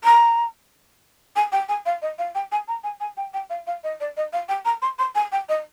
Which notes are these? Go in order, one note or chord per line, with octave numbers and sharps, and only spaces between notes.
A#5
G#5
G5
G#5
F5
D#5
F5
G5
G#5
A#5
G#5
G#5
G5
G5
F5
F5
D#5
D5
D#5
F5
G5
A#5
C6
C6
G#5
G5
D#5